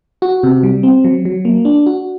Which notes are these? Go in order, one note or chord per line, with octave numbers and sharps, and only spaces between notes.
F#4
C3
G3
C4
F#3
F#3
A#3
D4
F#4